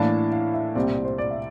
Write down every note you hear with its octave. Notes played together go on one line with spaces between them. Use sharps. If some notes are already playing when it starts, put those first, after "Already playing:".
Already playing: A2 E3 A#3 D4 A5
F5
E5
C2 A#2 G3 C4 D5
D5
C5
D5
E5